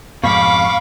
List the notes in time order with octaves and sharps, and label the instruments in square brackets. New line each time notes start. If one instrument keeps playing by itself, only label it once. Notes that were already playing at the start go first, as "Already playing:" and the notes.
[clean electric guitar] F2 G#2 B2 [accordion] F5 C#6 [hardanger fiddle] B5 D6